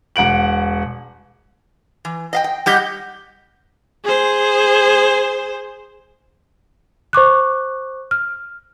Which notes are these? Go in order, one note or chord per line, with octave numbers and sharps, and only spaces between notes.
E1 F#5 D7 F#7
E3
D#5 F5 G5
G5
G3 G4 D#5 F#5 G6
G#4 C5
C5 C#6 D6 F#6
F6